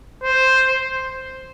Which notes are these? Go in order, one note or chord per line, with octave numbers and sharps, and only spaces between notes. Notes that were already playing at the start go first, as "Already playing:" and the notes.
C5